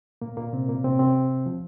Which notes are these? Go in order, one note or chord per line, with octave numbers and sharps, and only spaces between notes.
A#2 A#3
A#2 A#3
C3 C4
A#2 A#3
C3 C4
C3 C4
F3